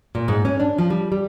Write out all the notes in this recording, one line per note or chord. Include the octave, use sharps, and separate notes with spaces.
A#2
G#2
C#4
D4
F3
G3
G3